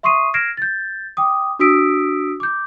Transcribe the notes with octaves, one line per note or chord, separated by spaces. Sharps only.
E5 C6 C#6 D#6 C7 D#7
F6 G#6 A#6 C7 D7 E7
G6 A6
G5 D6 D#6
D4 F#4 D#6 E6 B6 D7
D6 G6